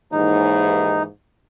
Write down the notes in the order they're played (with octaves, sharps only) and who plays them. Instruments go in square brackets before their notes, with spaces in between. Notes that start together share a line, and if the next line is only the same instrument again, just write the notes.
[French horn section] D#2 G#2 E3 [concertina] D#4